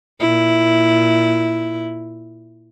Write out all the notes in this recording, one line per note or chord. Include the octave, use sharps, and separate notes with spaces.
A#2 E4